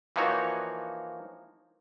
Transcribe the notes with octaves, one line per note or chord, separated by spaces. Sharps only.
E3 F3 A#3 D#4 F#4 C#5